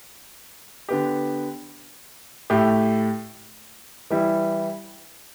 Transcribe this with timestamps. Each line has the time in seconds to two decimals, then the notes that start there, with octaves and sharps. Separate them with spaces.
0.89 D3 B3 G4
2.50 A2 A3 G4
4.10 E3 G3 E4